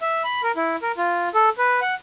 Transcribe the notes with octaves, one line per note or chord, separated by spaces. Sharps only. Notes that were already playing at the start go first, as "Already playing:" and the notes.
E5
B5
A#4
E4
A#4
F4
A4
B4
F#5